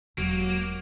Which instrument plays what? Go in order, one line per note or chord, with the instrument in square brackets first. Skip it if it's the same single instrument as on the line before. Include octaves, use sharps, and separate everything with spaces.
[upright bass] E1 [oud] F#3 [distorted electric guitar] A#3